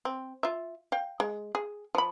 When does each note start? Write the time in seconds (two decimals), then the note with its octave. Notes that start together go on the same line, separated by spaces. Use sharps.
0.05 C4
0.43 F4 E5
0.92 F5 G5
1.20 G#3
1.55 G#4
1.95 F3 B5